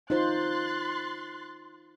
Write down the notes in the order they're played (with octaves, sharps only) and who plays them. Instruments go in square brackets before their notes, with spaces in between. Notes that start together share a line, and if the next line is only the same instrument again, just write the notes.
[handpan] D#4 F4 C5 [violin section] C6 F#6 A6